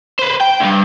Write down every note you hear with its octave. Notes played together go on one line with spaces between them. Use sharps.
B4 C5
G5
D2 G2